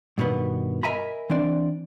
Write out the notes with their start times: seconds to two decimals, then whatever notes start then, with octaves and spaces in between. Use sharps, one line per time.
0.18 G2 B2 D#3 B3
0.83 A#4 D#5 E5 G#5 A#5 B5
1.30 E3 C4 D4 D5